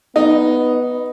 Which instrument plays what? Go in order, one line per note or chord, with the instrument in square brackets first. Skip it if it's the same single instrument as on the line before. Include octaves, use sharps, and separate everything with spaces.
[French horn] B3 [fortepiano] D#4